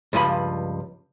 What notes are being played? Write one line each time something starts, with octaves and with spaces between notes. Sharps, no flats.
C#2 G2 F3 G#5 B5